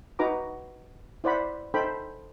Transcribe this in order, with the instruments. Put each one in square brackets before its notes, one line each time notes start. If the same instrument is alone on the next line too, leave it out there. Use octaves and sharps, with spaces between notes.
[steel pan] D#4 F#4 B4 A#5 D6
E4 C5 D5 F#5 B5
D#4 A4 C5 G5 B5